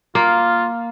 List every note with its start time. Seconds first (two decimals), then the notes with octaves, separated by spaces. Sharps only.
0.15 A#3 F4